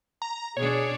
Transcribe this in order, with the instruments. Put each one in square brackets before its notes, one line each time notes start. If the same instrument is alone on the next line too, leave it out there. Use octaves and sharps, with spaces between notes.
[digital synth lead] A#5
[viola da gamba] B2 D4 [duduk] G#4 [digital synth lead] C#5